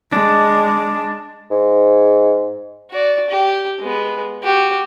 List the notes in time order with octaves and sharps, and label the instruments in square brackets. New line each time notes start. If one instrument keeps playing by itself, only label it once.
[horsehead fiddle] G#3 [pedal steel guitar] D4
[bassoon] G#2
[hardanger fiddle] F#4 D5
G4
G#3 B3
F#4 G4